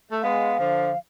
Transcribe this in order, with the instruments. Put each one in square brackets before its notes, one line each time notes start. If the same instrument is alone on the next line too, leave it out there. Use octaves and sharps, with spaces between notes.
[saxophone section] A3
[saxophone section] G#3 B3 [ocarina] F5
[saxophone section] D3 F3